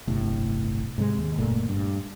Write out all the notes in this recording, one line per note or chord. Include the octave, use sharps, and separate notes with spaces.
D1 G1 A2 C3
G#2 C3 G#3
D#2
F#1 A#2 A3
G2